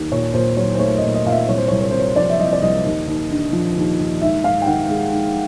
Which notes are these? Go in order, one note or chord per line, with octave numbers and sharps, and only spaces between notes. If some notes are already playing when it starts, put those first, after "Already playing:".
Already playing: D#2
A#2 C#5
A#2 C5
F#3 C#5
C5
A3 C#5
D#5
A#2
D#5
A#2 F5
E5
C2 C#5
C5
C2 C#5
C#5
C3 C5
C#5
F3 D5
E5
C2 D#5
D5
C2 D#5
D#2
D#2
D3
F3
D#2
D#2
G#2 E5
G#2 F5
G5
D#3 F#5
G#3
G#2